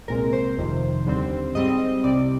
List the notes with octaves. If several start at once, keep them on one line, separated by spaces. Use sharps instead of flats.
C2 A#2 G#3 C4 A#4
C5
G1 F2 C3 D#3
D#2 D3 G3 C4
G#2 G3 C4 D#5
C2 C3 G3 C4 D5